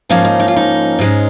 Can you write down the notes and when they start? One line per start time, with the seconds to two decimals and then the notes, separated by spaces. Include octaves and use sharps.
0.09 G#2 F3 A#3 C#4 D#4
0.25 D#4
0.40 D#4
0.48 F4
0.56 D#4
0.99 G#2 G#3 C#4